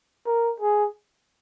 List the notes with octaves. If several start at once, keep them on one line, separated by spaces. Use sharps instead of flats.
A#4
G#4